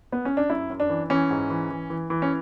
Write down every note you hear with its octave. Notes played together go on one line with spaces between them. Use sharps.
B3
C#4
D4
F#2 E4
F#2
D4
E3
E3 C#4
G#2
E3
E3
E3
E3
C#4